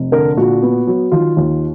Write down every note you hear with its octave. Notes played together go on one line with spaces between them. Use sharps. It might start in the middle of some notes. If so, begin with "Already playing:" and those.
Already playing: F1
D3 A#4
A#2 F#4
B3
F#3
D#3 F4
D#2